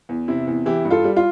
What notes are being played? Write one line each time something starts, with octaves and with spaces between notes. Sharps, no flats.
E2
C3 E4
E2
E3 E4 G4
G2
F4 A4
G3
F4